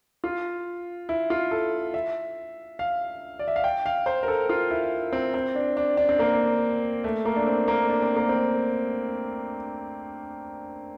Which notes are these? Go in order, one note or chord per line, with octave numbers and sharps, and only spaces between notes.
F4
E4
F4
A4
E5
F5
D5
E5
F5
G5
F5
C5
A#4
A4
F4
E4
C4
C4
D4
D4
D4
C4
A#3
A3
A#3
D4
C4
A#3
D4
C4
A#3
C4